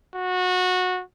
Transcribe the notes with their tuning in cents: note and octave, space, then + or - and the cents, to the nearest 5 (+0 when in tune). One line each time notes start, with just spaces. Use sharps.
F#4 -20